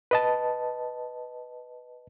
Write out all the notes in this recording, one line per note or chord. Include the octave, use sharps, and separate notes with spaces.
B4 D#5 A5